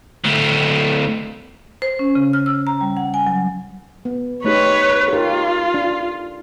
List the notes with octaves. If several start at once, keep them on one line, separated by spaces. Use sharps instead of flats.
D2 A2
C5
C#4
C#3
F6
E6
A#5
G3
F#5
G#5
F#3
B3
A3 D#4 G4 B4 C#5
D#4 F4 G4 A#4
D4